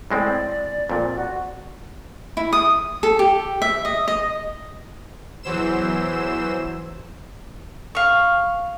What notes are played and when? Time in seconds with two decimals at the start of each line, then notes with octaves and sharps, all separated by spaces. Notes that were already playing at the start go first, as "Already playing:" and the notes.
0.11 A2 G#3 C4 D5
0.90 F2 A#2
1.16 F#4
2.37 E4
2.53 D#6
3.03 A4
3.19 G4
3.62 E5
3.85 D#5
4.08 D#5
5.43 E2 E3 F#3 C5 E6 E7
7.95 F5 C#6